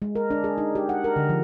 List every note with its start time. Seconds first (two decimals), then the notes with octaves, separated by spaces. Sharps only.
0.02 G#3
0.15 A#4
0.30 D4
0.44 G#4
0.58 D#4
0.75 G4
0.89 F#5
1.04 A#4
1.16 D3
1.29 F3